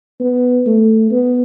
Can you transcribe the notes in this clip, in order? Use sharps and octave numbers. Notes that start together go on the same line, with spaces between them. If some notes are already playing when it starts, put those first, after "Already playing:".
B3
A3
B3